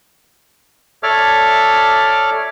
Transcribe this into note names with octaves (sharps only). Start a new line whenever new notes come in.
A4 C#5 D5 E5 D6 F6